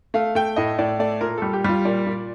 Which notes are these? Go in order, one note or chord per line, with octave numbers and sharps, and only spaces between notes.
A3 F5
A3 G5
A2 D#5
A2 D5
A3 D5
A#2 A#4
G3 A4
G4
G3 F4
A#2 D5
A#2